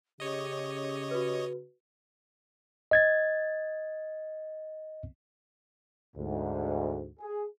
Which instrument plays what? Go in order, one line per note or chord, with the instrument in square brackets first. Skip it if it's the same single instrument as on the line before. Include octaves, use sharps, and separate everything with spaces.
[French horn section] C#3 [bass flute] G4 [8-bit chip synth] C#5 D#5
[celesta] F#4 B4
[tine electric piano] D#5 G#6 A6
[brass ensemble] D2 G#2
G#4